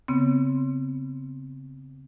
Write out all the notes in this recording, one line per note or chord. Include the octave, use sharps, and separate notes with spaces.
C#3 B3 C4